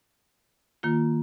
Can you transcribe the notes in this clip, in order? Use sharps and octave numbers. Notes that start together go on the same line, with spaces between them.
D#3 A#3 F4